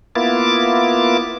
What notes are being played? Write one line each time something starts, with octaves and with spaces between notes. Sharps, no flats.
A#3 B3 E4 F4 D6 A6